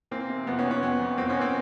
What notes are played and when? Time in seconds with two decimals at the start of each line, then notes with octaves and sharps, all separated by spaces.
0.11 E3 A#3 C4
0.30 C3
0.47 F2 B3
0.59 B3 C#4
0.65 E3
0.71 B3 C#4
0.82 F2 B3
1.00 F2
1.17 F2 A#3 C4
1.29 B3 C#4
1.35 E3
1.41 A#3 C4